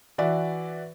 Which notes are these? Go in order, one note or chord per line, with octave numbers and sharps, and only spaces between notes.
E3 F#4 D5 E5